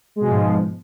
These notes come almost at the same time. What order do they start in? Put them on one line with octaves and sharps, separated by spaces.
G#3 B2 F3 G#2